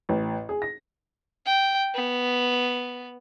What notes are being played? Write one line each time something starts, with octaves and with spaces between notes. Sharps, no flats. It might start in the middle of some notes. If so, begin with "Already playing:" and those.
A1
G#4
A#6
G5
B3